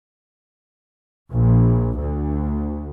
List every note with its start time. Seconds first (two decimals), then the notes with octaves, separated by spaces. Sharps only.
1.32 A#1
1.98 D2